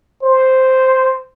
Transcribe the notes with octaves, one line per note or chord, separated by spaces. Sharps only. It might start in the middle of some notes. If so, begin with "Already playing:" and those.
C5